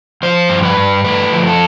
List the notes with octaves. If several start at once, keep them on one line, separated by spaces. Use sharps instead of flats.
F3 C5
G2
B4
G2
A3 B4
F3
A4